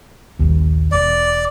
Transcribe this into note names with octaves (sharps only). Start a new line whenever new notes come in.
D#1 A#1 D#2
E1 D5